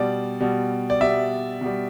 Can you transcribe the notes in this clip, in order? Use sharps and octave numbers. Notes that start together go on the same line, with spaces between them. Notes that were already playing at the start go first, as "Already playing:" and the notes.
Already playing: B2 G3 D5
B2 G3
D5
B2 G3 E5
B2 G3